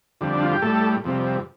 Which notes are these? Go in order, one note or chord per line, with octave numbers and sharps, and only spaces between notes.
F2 D3 G3
D4
F4
G4
A2 G3 A4
F2 C3 G3